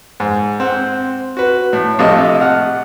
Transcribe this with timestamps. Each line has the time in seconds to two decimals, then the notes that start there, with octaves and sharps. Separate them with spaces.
0.20 G#2
0.60 C4 F#5
1.37 F#4 B4
1.73 A2
1.99 A#1 C3 A3 D#5
2.41 F#5 F6